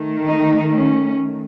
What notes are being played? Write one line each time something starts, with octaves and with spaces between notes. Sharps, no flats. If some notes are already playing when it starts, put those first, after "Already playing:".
Already playing: D#3 A3
D#4
C#4